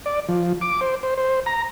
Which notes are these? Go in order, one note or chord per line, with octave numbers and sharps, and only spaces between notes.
D5
F3
D6
C5
C5
C5
A#5